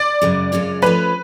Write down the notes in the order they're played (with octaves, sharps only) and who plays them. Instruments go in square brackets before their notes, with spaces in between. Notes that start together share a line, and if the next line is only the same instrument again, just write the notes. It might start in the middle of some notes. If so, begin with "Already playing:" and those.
Already playing: [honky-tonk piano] D5
[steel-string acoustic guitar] F#2 C#3 G#3
F#2 C#3 G#3 C#4 F4
[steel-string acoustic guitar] F3 A3 C#4 [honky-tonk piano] B4